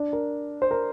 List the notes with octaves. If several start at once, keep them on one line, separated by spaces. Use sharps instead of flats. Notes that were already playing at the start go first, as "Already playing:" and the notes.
Already playing: D4
A#4
C5
A#4